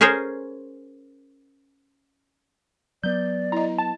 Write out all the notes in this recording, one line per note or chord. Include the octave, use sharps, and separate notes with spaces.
C#4 G#4 A#4 C5 C#5
F#3 B3 D5 G6
E4 D#5 A#5
A5